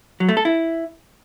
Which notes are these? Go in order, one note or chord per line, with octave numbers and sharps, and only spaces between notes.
F#3
A3
A4
E4